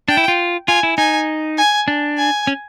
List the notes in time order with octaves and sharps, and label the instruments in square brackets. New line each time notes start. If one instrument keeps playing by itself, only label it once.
[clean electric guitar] D4 [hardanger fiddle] G5
[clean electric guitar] E4
F4
[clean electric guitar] F4 [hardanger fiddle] G#5
[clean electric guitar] E4
[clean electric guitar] D#4 [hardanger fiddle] G#5
[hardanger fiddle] G#5
[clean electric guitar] D4
[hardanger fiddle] G#5
[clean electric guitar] C#4